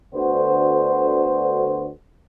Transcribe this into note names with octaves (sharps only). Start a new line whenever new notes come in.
D2 D3 B3 F#4 C5